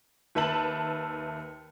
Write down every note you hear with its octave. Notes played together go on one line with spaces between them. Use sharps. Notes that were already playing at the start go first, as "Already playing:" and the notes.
D#2 B4 E5 A5 F#7